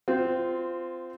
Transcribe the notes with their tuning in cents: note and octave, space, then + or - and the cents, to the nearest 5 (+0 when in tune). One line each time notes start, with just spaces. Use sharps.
C4 -20 F4 -5